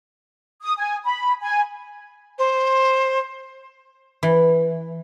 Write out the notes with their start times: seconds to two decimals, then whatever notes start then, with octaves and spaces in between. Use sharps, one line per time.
0.62 D#6
0.78 G#5
1.05 B5
1.42 G#5
2.39 C5
4.23 E3